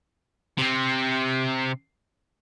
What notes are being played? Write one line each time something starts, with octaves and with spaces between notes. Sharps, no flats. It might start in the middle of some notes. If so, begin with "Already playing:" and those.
C3 C4